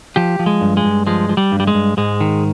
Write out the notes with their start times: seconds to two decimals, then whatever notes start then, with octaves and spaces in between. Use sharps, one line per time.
0.16 F3 G4
0.39 F3
0.46 G#3
0.61 G2
0.77 G#3
0.85 G2
1.07 F3 G#3
1.29 F3
1.37 G3
1.52 G2
1.60 G3
1.67 G#3
1.74 G2
1.97 G#2 G#3
2.21 D#3